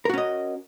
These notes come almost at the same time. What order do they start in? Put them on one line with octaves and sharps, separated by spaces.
A#4 F#4 C#4 D#5